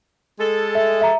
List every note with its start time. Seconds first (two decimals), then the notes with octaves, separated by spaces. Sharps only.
0.40 G#3 A4
0.75 E5
1.01 E5 A#5